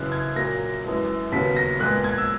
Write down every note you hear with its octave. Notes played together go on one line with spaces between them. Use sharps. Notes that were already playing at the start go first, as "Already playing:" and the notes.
Already playing: F#2 C#3 E3 F#6
G#6
A#2 F#3 A#3 A#6
F#2 E3 G#3
D#2 C#3 F#3 B3 B6
A#6
A#2 G#3 B3 F#6
G#6
E6